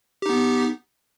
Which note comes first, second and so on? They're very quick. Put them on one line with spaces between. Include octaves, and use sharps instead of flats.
G4 D#4 B3